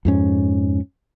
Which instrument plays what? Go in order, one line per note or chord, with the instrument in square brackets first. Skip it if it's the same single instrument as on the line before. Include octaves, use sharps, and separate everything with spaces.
[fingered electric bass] F2 G#2 C#4